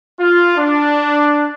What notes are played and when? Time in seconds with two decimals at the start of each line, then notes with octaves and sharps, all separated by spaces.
0.20 F4
0.57 D4